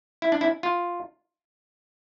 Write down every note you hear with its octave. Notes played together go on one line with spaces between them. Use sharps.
E4
D4
E4
F4